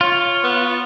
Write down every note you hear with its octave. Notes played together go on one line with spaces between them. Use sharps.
F4 C#5
B3